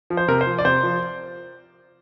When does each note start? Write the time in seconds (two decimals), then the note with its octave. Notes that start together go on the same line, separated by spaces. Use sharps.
0.10 F3
0.17 C5
0.28 C3 A#4
0.41 C5
0.47 F3
0.59 D5
0.65 C3 C5
0.83 F3